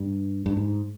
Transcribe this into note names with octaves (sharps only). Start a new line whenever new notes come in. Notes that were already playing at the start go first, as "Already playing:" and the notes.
Already playing: G2
G2
G#2